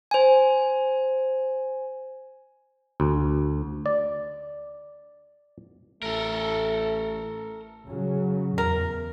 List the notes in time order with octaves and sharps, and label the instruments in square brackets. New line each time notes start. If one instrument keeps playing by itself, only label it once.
[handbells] C5 G#5
[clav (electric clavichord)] D2
D5
[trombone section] A1 A3 [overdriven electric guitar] A4 A#4
[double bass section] C#3 F#3
[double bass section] E2 [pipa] A#4